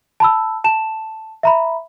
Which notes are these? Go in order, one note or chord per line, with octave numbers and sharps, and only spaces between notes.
A5 B5 E6
A5 E7
E5 A#5 B5